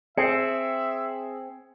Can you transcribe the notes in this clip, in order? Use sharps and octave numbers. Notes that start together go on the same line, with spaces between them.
C4 G#4 E5 C#7